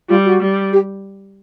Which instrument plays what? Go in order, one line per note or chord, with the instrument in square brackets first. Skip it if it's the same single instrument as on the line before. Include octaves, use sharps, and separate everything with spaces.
[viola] G3 [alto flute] F4
[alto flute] F#4
[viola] G3
[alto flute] G4